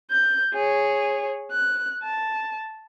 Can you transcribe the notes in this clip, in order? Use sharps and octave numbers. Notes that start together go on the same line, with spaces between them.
G6
G#4 C#5
F#6
A5